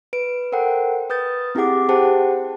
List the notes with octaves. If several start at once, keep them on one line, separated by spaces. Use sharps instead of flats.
B4 D7
A4 A#4 C5 F#5 G5
B4 D#6 G6 A6
C4 E4 G4 G#4 F#5 D6
G4 G#4 C5 F#5 G5 A5